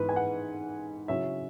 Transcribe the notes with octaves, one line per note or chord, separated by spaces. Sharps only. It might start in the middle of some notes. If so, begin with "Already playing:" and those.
Already playing: G#2 E3 B3 E4 B4
G#5
F#5
C#3 F#3 C#4 E4 E5